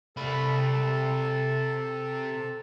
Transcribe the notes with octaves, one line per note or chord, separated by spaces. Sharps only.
C3 A4 B5